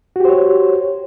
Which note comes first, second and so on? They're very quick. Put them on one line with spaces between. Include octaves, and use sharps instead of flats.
F#4 G4 C5 C#5